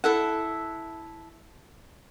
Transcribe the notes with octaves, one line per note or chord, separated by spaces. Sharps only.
E4 A4 F#5